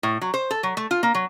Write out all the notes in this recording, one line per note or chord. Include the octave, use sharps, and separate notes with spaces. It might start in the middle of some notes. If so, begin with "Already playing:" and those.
A2
F#3
C5
A4
F#3
A3
F4
A#3
F#3